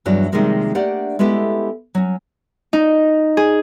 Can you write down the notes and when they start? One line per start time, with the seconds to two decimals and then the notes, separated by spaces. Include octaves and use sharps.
0.05 E2 G2 F#3 B3 D4
0.32 C3 D#3 F3 G3 G#3 A#3
0.75 A3 A#3 D4 G4 D5 F#5
1.19 G#3 B3 E4 G4 A4
1.95 F#3 C#4
2.73 D#4
3.37 G#4